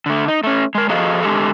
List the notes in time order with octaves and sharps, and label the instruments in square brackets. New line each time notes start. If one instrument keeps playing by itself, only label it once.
[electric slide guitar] D3 A3
D#4
A3 C#4
G#3 A#4
F3 F#4 G#4 A4 D#5 F5
D3 G#3 G4 A4